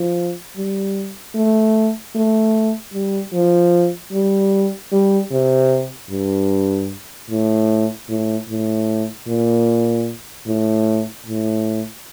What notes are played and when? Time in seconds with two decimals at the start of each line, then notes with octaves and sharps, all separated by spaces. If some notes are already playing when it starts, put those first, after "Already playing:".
Already playing: F3
0.56 G3
1.35 A3
2.15 A3
2.93 G3
3.33 F3
4.13 G3
4.92 G3
5.32 C3
6.11 G2
7.31 A2
8.09 A2
8.49 A2
9.28 A#2
10.47 A2
11.27 A2